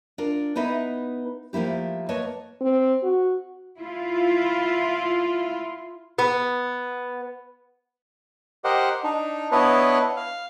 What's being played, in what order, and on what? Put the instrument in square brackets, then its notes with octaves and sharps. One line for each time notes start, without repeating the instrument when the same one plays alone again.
[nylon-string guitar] D4 F4 A#4
B3 D#4 E4 B4 D#5 E5
F3 A3 A#3 E4 G4
A#3 B4 C#5 D#5 A5
[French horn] C4
F#4
[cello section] E4 F4
[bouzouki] B3
[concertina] G4 A#4 C5 D#5 F#5
D4 D#4
B3 D4 E4 B4 C#5 D#5
F5